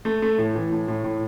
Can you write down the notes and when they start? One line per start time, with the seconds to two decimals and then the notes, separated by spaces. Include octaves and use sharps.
0.05 A3
0.22 A3
0.38 A2
0.55 E3
0.72 A2
0.88 A2
1.04 A2